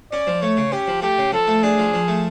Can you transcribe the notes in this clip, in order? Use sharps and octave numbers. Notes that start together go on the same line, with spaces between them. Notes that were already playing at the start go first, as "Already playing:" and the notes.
C#4 D5
F3
A3 C#5
C#3
C#4 G4
F3
A3 G4
C#3
F3 A4
A3
D4 G#4
F3
F3
A3